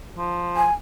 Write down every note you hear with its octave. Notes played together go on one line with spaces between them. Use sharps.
F3
G#5